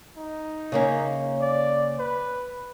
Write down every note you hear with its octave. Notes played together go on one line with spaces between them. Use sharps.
D#4
C#3 A#3 C#4
D5
B4